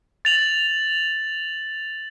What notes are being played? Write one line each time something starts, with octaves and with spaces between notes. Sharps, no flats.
A6 F7 F#7